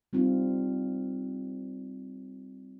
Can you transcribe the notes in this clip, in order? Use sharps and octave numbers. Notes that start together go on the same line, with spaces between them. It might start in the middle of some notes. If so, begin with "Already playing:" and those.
G3 C4 D#4 F4